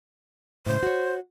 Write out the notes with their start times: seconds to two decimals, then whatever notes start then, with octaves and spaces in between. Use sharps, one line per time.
0.66 A2 C#3 G#3 C5
0.83 F#4 C#5